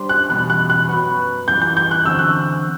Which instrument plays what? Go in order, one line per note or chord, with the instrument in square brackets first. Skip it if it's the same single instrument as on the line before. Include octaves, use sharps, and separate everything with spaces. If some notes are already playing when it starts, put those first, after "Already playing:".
Already playing: [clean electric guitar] G3 D4 G4 C5
[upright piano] F#6
[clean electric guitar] E2 B2 G3 [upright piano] F#6
[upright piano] F#6
F#6
[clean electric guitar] F#2 F#3 B3 F#4 B4
[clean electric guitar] F#2 E3 G3 [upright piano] G6
[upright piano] G6
G6
F#6
[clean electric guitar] E2 D3 F#3 C4 F#4 [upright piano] E6
[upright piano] F#6